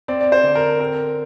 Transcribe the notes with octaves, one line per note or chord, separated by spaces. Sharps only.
C4 D5
D5
C5
D3
A#4
C4 A#4